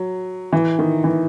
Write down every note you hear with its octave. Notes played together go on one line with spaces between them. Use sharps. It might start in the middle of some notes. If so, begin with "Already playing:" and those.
Already playing: F#3
E3
D#3
E3